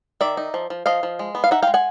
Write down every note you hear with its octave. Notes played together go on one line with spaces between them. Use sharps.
D#3 D5 E5
D#4
F3
F3
F3 D#5 F5
F3
G#3
B3
F5
D#4 E5 F#5
F5 G5
G#3
F#5 G#5